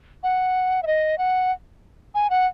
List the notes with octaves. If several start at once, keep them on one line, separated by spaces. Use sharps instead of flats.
F#5
E5
D#5
F#5
G#5
F#5